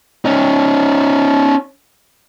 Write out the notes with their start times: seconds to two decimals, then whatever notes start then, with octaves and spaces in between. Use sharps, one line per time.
0.25 C#4 D#4